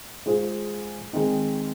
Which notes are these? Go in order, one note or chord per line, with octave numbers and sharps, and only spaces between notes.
G#3 F4 G#4 C5
D#3 G#3 C4 D#4